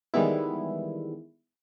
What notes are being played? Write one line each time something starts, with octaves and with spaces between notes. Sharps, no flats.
D#3 E3 G3 G#3 B3 E4